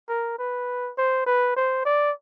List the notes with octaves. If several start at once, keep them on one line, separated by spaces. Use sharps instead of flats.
A#4
B4
C5
B4
C5
D5